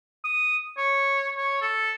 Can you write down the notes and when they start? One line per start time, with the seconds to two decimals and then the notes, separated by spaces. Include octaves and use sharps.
0.24 D#6
0.78 C#5
1.37 C#5
1.61 A4